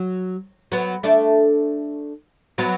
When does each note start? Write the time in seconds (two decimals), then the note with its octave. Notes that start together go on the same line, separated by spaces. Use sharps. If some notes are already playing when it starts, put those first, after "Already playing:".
Already playing: F#3
0.72 F#3 B3
1.03 A3 D4
2.58 F#3 B3